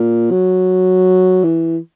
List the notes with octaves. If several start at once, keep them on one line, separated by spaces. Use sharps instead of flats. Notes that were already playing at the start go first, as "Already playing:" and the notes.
Already playing: A#2
F#3
E3